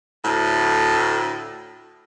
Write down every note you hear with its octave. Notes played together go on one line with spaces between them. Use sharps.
D2 A2